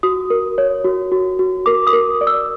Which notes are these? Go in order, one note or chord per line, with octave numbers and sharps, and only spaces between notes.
F#4 D#6
A#4
C#5
F#4
F#4
F#4
A#4 D6
D#6
A#4
D5
E6